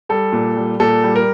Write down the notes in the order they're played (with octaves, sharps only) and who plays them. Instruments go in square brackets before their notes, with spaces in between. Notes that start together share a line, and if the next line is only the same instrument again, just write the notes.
[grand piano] G3 A4
A#2
G3
A#2 A4
G3
A#4